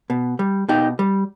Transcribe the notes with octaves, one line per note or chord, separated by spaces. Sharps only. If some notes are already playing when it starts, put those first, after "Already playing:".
B2
G3
B2 D#4 G4
G3